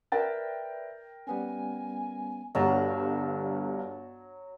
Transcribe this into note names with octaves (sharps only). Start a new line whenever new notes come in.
A#4 B4 D5 E5 G5 A6
G3 B3 C#4 G#5
G1 G2 F#3 A5 A#5